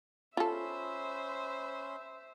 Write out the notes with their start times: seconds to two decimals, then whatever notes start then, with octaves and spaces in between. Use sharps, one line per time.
0.37 C#4 F4 A4 C5 E5 B5 C6